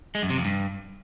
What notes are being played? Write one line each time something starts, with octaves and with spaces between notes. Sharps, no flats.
G#3
F#2
C3
F2
G2